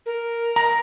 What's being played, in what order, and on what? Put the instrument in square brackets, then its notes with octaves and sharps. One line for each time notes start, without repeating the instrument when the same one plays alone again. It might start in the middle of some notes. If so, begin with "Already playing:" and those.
[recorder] A#4
[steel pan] A#5